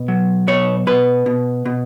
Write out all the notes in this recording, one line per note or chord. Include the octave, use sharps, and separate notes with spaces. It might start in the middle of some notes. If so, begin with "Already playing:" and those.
Already playing: B2
F#3
B2 C#5
B2 B4
B2
B2